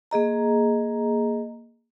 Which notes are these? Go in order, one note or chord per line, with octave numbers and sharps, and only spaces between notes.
A#3 G#4 D#5 A#5